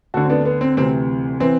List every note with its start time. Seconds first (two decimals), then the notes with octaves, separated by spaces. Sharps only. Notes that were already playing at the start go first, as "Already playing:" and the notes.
0.14 D2 D3 F#4 A4
0.25 C4
0.30 B3 D4
0.45 B3
0.61 C4
0.77 D2 C3 E3 C4
1.40 E3 C4